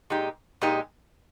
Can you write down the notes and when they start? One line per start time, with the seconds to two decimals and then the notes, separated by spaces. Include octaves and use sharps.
0.10 A#2 G#3 D#4 G4
0.62 A#2 G#3 D#4 G4